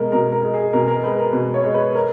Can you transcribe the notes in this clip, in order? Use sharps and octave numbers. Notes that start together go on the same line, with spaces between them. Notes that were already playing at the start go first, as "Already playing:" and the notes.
Already playing: B2 G#3 A#4
B2 A#4
A#4
G#3
G#4
B2 A#4
A#4
G#3 B4
A#4
B2 A#4
C#5
G#3
B4
A#4